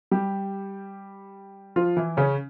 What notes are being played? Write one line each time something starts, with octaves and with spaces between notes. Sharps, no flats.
G3 G4
F3 F4
E3 E4
C#3 C#4